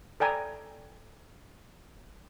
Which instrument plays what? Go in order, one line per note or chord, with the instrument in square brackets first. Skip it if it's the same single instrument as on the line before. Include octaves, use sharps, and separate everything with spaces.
[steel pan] A4 D5 G5 G#5 A#5 B5